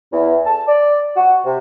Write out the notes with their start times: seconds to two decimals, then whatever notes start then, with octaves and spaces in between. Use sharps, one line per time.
0.11 E2
0.44 A5
0.67 D5
1.16 F#4
1.44 C3